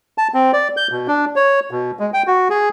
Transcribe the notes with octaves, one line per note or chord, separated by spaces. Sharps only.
A5
C4
D5
G6
B2
D4
C#5
B2
G#3
G5
F#4
G#4